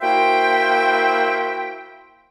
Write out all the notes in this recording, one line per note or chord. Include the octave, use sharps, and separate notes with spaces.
A#3 E4 F#4 C5 E5 G5